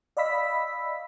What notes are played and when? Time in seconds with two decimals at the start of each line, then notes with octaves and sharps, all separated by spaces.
0.17 D5 D#5 F5 B5 E6 B6